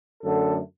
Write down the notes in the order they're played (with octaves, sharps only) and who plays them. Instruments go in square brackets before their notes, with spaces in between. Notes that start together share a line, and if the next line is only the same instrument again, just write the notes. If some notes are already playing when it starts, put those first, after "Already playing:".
[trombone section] F#2 D3 A3 A4